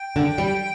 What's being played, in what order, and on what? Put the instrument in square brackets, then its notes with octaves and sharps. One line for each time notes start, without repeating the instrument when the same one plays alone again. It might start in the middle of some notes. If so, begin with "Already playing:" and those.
Already playing: [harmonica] G5
[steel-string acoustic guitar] D3
G3